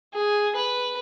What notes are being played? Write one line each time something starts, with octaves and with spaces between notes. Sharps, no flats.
G#4
B4